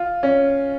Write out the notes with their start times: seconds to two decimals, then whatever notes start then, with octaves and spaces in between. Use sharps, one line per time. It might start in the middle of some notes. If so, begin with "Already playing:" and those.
Already playing: F4
0.23 C#4